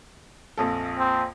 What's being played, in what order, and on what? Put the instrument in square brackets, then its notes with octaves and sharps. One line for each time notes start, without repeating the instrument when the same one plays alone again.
[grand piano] A#1 F2 A4
[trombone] C4